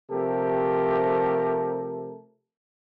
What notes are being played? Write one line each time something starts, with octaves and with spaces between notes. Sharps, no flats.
C3 F3 A3 G4 A4 A#4